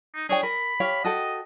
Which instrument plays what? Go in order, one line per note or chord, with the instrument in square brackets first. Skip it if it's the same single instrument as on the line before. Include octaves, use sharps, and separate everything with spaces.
[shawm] D#4
[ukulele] D4 C#5 G5 [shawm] G#4
[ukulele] A#4 [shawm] B5
[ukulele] G4 C#5 F5
[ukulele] F#4 A4 G5 [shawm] D#5